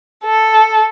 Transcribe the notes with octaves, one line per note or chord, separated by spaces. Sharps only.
A4